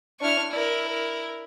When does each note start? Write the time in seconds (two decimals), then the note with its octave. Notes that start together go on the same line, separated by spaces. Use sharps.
0.20 D4 E4 C#6 F6
0.51 E4 A#4 D5
0.88 A#4